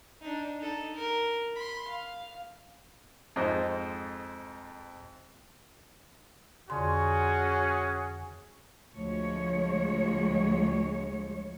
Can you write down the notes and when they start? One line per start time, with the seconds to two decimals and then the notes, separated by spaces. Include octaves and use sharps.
0.21 D4 D#4
0.58 D#4 A4
0.96 A#4
1.56 B5 C6
1.88 F5
3.36 F2 G#2 C5 D#5
6.70 F2 D3 C#4 F#4 G#4 C6
8.94 D2 F3 G#3 C#5